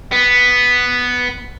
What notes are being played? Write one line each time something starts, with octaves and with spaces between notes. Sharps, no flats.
B3